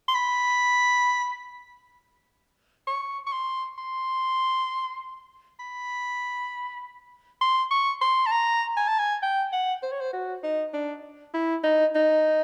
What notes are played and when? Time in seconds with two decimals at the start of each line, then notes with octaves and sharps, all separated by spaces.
0.08 C6
0.15 B5
2.87 C#6
3.27 C#6
3.33 C6
3.78 C6
5.59 B5
7.41 C6
7.71 C#6
8.01 C6
8.26 A5
8.32 A#5
8.77 G#5
8.88 A5
8.99 G#5
9.22 G5
9.52 F#5
9.83 C5
9.92 C#5
10.00 C5
10.13 F#4
10.43 D#4
10.73 D4
11.34 E4
11.64 D#4
11.95 D#4